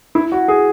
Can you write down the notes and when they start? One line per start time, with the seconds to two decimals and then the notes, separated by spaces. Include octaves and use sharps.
0.15 E4
0.32 F#4
0.48 G#4